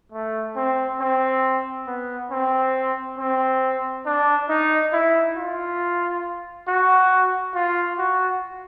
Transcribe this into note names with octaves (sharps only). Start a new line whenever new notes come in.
A3
C4
C4
B3
C4
C4
D4
D#4
E4
F4
F#4
F4
F#4